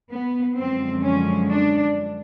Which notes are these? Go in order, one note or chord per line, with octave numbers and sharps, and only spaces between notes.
B3
F#2 D3 F3 G#3 C4
C#4
D4